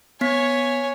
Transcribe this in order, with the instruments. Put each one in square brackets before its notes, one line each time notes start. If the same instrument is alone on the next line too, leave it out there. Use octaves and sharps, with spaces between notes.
[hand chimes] B3 B6 [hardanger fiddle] C#5 G#5